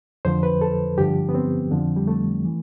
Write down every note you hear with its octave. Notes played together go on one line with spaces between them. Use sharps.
F2 D3 F3 C5
B4
A4
G2 D3 F3 G4
B3
C4
F2 D3 F3
G3
A3
E3